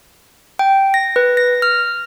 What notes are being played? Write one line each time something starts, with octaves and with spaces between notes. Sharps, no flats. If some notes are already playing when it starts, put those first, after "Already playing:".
G5
A#6
B4
A#6
F6